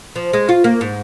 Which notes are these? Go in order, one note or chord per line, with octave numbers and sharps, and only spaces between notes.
F3
G#3
F4
A#3
G#2